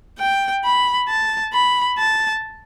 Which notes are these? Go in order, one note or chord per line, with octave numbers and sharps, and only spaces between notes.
G5
B5
A5
B5
A5